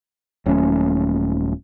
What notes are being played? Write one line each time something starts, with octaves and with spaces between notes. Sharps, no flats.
D#1 F#3 A3 C#4